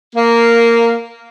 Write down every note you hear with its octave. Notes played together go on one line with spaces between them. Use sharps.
A#3